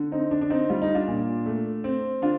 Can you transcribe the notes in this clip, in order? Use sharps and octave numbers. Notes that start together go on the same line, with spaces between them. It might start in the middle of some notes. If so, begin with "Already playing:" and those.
Already playing: D3
C4 D#4
D3 D4
D4
C4 D#4
G3 F4
D#4
D4 F4
A#2
A3
C4
D3 D4 F4